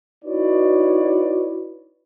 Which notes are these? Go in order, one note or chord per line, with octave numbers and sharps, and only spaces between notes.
D#4 E4 F#4 B4 C#5 D5